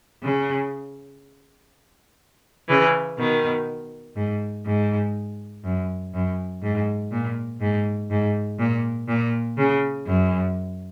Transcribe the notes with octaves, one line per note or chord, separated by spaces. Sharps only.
C#3
C#3 E3
B2 D#3
G#2
G#2
F#2
F#2
G#2
A#2
G#2
G#2
A#2
A#2
C#3
F#2